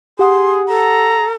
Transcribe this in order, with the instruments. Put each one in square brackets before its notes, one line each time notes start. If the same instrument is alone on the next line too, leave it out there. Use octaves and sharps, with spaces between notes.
[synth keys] G4 F#5 D#6 [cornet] G#4 [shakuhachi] C6
[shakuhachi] A4 [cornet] A#5